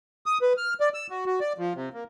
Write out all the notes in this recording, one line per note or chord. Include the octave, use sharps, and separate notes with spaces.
D#6
B4
F6
D5
E6
F#4
F#4
D5
F3
C3
A#3